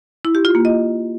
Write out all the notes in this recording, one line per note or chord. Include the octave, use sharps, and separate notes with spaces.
E4
G4
F4
A#3
D#5